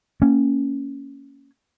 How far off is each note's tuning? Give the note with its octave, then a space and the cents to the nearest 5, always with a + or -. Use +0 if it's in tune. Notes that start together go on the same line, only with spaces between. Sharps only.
A#3 -15 C#4 +0